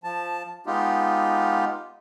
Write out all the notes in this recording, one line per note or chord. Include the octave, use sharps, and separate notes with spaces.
F3 A5
G#3 B3 D#4 F4 G4